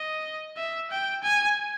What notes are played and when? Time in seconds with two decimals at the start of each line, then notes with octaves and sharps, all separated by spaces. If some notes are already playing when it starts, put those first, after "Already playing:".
Already playing: D#5
0.57 E5
0.91 G5
1.23 G#5